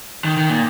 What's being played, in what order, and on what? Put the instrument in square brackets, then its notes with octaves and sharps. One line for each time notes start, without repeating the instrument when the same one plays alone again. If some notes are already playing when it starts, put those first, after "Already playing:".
[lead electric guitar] D#3
D#3
A#2